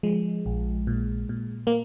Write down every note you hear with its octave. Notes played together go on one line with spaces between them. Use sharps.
F3 G#3
A#1
A#2
A#2
A#3